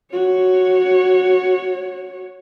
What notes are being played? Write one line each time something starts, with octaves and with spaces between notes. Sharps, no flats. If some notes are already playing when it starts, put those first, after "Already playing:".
F#4 C#5